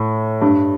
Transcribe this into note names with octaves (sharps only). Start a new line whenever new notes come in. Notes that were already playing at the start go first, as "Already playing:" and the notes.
Already playing: A2
G2